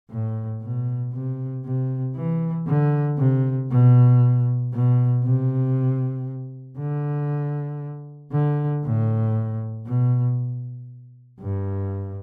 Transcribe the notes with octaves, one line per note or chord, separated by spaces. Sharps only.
A2
B2
C3
C3
E3
D3
C3
B2
B2
C3
D3
D3
A2
B2
G2